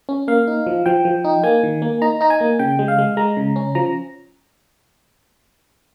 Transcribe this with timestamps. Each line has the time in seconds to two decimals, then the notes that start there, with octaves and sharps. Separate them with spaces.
0.09 C#4
0.28 A#3 F5
0.47 D#4
0.67 F3
0.86 F3 G5
1.05 F3
1.24 D#4
1.43 A#3 G#5
1.64 D#3
1.82 A#3
2.02 D#4 A#5
2.21 D#4 A#5
2.30 G#5
2.41 A#3
2.59 C#3 G5
2.79 G#3
2.88 F5
2.98 G#3
3.17 G#3 A#5
3.37 C#3
3.56 C#4
3.75 F3 A#5